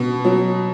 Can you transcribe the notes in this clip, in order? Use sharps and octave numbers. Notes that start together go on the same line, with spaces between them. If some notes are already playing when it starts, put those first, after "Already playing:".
Already playing: B2
F#3